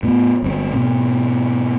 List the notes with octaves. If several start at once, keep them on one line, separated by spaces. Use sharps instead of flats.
A2 B3
G1 C4
G#2 B2